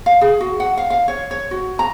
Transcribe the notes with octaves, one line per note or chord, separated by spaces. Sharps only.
F5
G#4
F#4
F#5
F5
F5
C#5
C#5
F#4
A#5